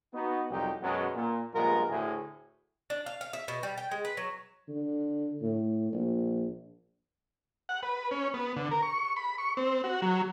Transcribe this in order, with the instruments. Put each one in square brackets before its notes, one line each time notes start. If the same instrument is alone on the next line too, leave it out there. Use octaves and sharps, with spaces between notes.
[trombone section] B3 D#4 F#4
C2 F2 F#3 D#4 G4
F#2 B2 F#3 G#3 B3
A#2
A#1 G2 G#3 B3 F4 A#4
D2 A2 G#4
[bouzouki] D4
F5
F5
E5
B2
G3
G5
G#3
B4
F#3
[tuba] D3
A2
A#1
[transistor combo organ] F#5
B4
C#4
B3
D3
A#4
C#6
B5
C#6
C4
F#4
F#3